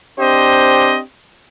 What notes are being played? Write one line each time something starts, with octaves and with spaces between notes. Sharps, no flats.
C4 D4 G4 C5 D#5